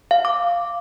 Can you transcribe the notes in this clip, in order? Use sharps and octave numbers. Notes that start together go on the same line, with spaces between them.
F5
D6